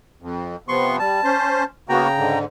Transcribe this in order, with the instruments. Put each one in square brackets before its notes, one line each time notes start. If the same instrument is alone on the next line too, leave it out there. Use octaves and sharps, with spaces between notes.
[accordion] F2
[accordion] C3 F3 B3 [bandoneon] C6 C#6
[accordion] G3 [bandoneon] A5
[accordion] C#4 C5
[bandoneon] C#3 G5 A#5 [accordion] A#3 B3 F#4
[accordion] G#2 D3